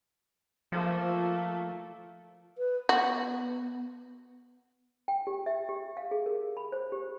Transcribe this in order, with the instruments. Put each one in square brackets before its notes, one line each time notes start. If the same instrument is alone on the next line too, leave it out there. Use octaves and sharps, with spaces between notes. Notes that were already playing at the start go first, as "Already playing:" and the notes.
[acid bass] F3 [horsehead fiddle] A3 A#3
[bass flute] B4
[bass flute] B3 [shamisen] F#4
[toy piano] G5
G4
E5
G4
F5
G#4
A#4
B5
C5
G4